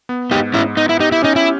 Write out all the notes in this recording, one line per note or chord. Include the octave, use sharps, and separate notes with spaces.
B3
G#2 D#4 G4
G#2 C#4 E4
B3 D#4
E4
D#4 G4
E4
C#4 D#4
E4